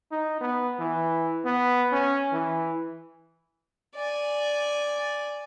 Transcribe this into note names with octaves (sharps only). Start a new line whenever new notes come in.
D#4
B3
E3
B3
C#4
E3
D5 G#5